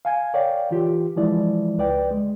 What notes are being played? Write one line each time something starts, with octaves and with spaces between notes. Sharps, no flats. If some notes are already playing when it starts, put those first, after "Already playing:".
F5 G#5 G#6
A#4 C#5 D5 F5 G5
E3 F4 G4
E3 F3 G#3 E4 D5
C#2 B4 D5 G5
G#3